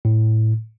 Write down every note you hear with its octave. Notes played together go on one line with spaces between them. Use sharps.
A2